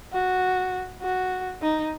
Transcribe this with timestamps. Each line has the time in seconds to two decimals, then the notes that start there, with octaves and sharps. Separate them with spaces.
0.12 F#4
1.01 F#4
1.62 D#4